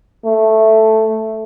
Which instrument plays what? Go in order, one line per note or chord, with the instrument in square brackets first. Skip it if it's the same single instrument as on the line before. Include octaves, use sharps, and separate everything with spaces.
[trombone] A3